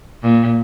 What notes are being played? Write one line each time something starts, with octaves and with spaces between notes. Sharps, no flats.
A#2